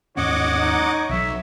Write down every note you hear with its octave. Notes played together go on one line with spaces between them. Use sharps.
D#2 G#2 C#4 C#5 D#5 F#5 D6
D#4
B1 F#3 E5